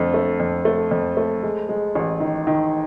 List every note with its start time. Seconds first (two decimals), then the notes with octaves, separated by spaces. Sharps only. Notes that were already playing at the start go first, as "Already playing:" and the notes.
Already playing: F2 D3 A3
0.14 A3
0.40 F2
0.65 A3
0.91 F2
1.17 A3
1.43 G#3
1.69 G#3
1.95 A1
2.20 D#3
2.47 D#3